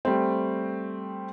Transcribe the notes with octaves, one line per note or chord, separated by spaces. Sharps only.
G3 A3 C4